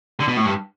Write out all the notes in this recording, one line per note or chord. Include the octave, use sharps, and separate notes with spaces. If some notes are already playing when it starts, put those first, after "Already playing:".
D3
B2
A2
G2